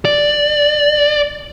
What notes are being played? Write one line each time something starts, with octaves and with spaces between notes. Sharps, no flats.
D5